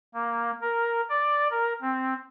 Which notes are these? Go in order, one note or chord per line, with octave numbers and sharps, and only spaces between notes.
A#3
A#4
D5
A#4
C4